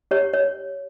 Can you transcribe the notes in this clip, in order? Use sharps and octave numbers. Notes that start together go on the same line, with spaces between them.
G4 C#5
C#5